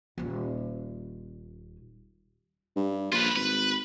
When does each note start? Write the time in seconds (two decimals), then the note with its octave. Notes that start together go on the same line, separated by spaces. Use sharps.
0.18 D#1 C#4
2.76 G2
3.12 A#1 F4 B4
3.36 G#1 B4